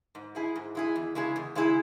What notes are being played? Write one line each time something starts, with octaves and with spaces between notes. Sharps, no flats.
G#2
G#3 E4 G#4
G#2
G#3 E4 G#4
E2
C#3 G#3 E4 G#4
E2
C#3 G#3 E4 G#4